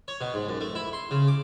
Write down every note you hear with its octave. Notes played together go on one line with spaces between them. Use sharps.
C#5
B2
G#2
F#2
A3
E4
C6
C#3
D6